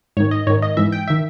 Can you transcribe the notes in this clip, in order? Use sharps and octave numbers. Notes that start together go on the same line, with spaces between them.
G#2 D#3 C#5
D#5
G#2 D#3 C#5
D#5
G#2 E3 E5
G5
D#3 E5